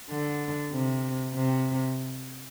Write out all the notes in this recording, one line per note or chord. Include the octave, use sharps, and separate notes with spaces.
D3
C3
C3